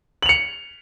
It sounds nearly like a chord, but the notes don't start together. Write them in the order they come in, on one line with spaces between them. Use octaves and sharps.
F#7 F7 C#7